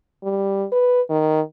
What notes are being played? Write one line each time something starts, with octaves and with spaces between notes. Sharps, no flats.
G3
B4
D#3